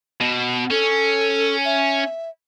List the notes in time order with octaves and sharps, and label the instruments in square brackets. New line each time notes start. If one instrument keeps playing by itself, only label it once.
[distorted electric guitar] B2
[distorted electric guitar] C#4 [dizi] A4
[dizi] E5